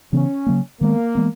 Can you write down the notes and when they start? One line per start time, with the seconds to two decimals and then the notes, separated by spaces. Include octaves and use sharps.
0.13 C#3 E3 B3 C#4
0.46 C#3 F#3 A#3
0.81 D#3 G#3 A#3 B3
1.15 E3 G#3 B3